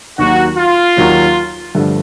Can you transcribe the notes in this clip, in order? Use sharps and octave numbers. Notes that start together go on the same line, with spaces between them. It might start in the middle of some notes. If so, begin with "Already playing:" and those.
D#2 D#3 F#3 A#3 F#4
F4
D#2 D#3 F#3 A#3
G1 G2 D3 F3 A3